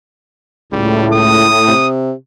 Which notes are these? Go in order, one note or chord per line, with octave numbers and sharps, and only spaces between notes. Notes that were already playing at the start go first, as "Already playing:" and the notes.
C#2 A2 G3
D#6
C3